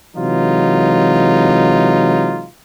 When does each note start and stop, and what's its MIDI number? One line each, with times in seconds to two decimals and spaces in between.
0.17 2.48 48
0.17 2.48 52
0.17 2.48 54
0.17 2.48 56
0.17 2.48 63
0.17 2.48 65